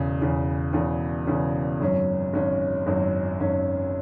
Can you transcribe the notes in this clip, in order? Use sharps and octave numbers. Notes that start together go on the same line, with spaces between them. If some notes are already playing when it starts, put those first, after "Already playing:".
Already playing: E1 E2 C#3
E1 E2 C#3
E1 E2 C#3
E1 E2 C#3
G#1 F#2 F#3 C#4
G#1 F#2 F#3 C#4
G#1 F#2 F#3 C#4
G#1 F#2 F#3 C#4